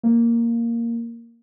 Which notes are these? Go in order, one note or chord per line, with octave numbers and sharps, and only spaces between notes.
A#3